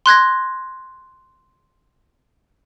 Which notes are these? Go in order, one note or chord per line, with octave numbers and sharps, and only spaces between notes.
C6 F#6 G#6 A#6